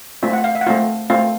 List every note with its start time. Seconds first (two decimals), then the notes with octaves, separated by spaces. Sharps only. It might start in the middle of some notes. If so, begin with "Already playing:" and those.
0.23 A3 C4 F4 E5
0.33 F#5
0.44 F5
0.55 E5
0.61 F#5
0.67 A3 C4 F4 F5
1.10 A3 C4 F4 F5